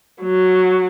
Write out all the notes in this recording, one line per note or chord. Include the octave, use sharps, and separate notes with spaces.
F#3